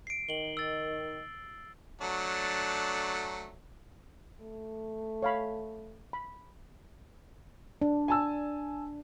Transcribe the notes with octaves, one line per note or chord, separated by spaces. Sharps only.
C7 D7
D#3 F#7 G7
E6 A6
F#3 A3 D4
A3
C#5 F5 B5
B5
D4
G#5 A5 E6